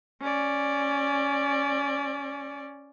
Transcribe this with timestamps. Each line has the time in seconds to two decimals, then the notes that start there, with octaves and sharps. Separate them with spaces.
0.21 C#4 D5